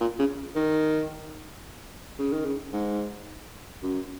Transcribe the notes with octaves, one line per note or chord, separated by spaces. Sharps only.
A#2
C#3
D#3
C#3
D#3
C#3
G#2
F#2